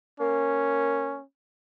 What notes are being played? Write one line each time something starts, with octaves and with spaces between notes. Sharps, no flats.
A#3 C#4